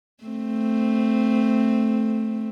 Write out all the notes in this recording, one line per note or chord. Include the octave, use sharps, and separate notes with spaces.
A3 C4